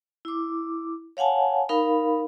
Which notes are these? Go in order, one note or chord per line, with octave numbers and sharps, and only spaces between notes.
E4 D6
C#5 F5 F#5 G#5 A5
D#4 A#4 F5 B5